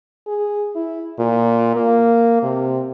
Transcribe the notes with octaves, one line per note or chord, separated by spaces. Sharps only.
G#4
E4
A#2
A#3
C3